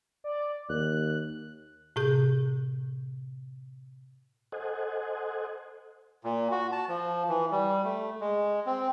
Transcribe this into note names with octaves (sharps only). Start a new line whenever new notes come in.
D5
D#2 F#6
A2 C3 G#4 G6
A4 C5 D#5 F#5 G#5
A#2
F#4
A5
F3
E3
G3
A3
G#3
C4